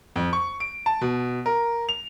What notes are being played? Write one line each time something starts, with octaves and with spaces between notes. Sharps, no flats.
F2
C#6
D7
A5
B2
A#4
F7